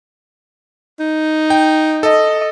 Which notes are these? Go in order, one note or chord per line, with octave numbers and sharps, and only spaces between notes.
D#4
G5
A4 D#5